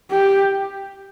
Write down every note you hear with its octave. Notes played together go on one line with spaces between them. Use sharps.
G4